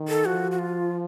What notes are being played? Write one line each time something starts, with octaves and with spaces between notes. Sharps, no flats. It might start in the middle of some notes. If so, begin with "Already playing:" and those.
Already playing: D#3
A4
F3 F#4
F#4
F4